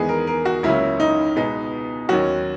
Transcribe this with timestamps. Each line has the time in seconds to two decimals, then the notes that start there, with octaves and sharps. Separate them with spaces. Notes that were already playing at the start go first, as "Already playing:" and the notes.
Already playing: E2 D#3 G#3 B3 G#4
0.09 A#4
0.27 A#4
0.45 F#4
0.63 C#2 C#3 F#3 A#3 C#4 E4
1.00 D#4
1.36 B2 G#3 B3 D#4
2.09 D#2 D#3 F#3 C#4 F#4